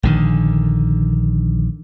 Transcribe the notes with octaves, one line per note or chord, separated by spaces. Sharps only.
A#1 D3 D#3